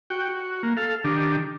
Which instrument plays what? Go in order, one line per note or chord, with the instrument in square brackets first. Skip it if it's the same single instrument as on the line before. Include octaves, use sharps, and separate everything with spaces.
[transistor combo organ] F#4 G5
F#4
A#3
A4 F5
D#3 D4 G4